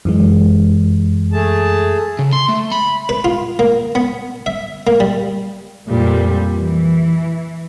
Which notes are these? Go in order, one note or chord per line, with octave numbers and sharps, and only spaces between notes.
F#2 E3 G#3
A3 G#4 A5
C#3
C6
A3
B5
B4
F4
A#3
B3
E5
A#3
G3
F2 A#2 G3
E3